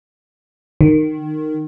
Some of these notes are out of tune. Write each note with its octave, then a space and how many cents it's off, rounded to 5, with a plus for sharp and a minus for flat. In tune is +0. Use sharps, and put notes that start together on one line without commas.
D#3 -15